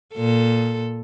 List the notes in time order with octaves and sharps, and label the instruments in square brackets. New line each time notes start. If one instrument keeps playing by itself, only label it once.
[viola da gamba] A#2 A4